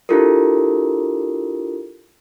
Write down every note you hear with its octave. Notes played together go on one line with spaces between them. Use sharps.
D4 E4 F4 G4 A4 A#4